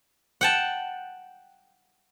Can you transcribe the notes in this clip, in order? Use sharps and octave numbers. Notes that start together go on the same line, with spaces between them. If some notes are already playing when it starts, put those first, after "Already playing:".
F#5 G5 A5